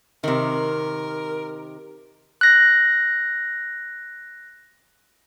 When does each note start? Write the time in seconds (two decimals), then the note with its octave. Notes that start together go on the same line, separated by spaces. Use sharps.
0.24 C3 D#3 A#4
2.41 F#6 A#6